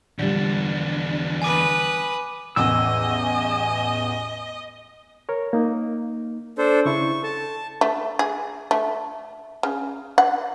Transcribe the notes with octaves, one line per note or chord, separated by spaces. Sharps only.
E2 D3 F3 G3 D4
B4 G#5 D6 D#6
A1 E2 D#5 G#5 E6
A#4 C#5
A#3 D#4
D4 A4 C5
C#3 E4 C#6
A4 A5
A3
G#4
A3
C#3
F#5